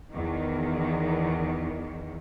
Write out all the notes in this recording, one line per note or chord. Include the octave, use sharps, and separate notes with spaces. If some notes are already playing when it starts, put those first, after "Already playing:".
E2 D#3